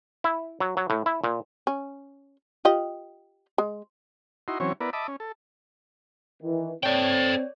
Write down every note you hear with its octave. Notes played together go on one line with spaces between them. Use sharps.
E4
F#3
F#3
A2
E4
A#2
C#4
F4 G4 D#5
G#3
D#4 E4 F#4 C6
E3 F#3 C4 C#4 C#5
B3 E4 A#4 B4 D5
D#5 E5 A5 B5 D6
C#4
A4
D#3 E3
C4 A4 C#5 D5 G5